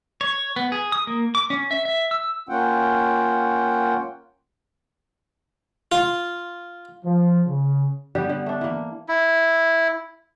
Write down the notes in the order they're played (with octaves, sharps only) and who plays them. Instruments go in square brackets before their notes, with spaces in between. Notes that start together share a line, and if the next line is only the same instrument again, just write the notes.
[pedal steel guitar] C#5
B3
G#4
D#6
A#3
D6
C#4
E5
E5
E6
[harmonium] A#3 C#4 F4 F#5 G5
[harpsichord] F4
[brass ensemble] F3
C#3
[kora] D3 G3 B3 G4
D3
A3 D4
E3 A#3
[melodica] E4